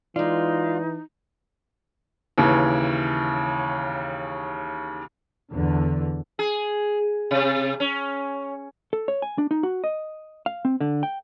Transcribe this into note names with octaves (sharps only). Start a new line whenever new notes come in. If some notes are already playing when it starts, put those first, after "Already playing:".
E3 G#3 D#4 F4 D5
D#2 C#3 E3
E2 D3 E3
G#4
C3
C#4
A4
C#5
G#5
D4
D#4
F#4
D#5
F5
C4
D3
G5